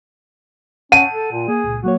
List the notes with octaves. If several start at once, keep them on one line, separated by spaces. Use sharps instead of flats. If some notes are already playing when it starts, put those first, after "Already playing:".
C#4 F#5 A5 D#7
A4
A#2
A#3 G#4
C#2 A#2
F#3 A#3 F#4 C#5